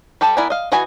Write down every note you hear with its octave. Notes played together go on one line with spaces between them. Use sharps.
G3 G4 A4
B3 E4 A#4 D5 G#5
D#5 F5
E3 F#4 D#5 G#5 B5